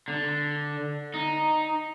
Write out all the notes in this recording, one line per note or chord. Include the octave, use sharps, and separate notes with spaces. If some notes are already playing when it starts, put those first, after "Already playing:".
D3
D#4